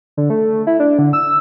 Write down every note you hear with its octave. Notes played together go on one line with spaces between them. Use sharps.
D3
A3
E4
D4
D3
E6